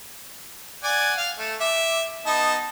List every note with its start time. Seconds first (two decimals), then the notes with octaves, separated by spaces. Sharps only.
0.83 D5 F#5 G#5
1.17 F5
1.38 A3
1.60 E5 D6
2.26 B3 D#4 A5